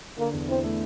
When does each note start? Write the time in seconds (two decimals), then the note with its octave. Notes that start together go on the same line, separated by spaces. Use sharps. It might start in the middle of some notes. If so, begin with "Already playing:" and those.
0.18 D3 A#3
0.33 E2
0.48 C4 E4
0.64 A3